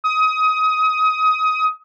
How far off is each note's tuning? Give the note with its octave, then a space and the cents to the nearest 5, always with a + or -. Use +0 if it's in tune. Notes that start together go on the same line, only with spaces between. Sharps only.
D#6 +20